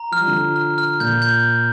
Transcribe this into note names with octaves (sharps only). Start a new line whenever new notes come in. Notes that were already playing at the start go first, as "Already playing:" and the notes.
Already playing: A#5
F3 F6
G3
D3 F3
F6
F6
F6
A#2 G6
G6
G6